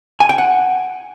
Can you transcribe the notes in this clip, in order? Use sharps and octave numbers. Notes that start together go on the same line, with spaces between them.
G#5
G5
F#5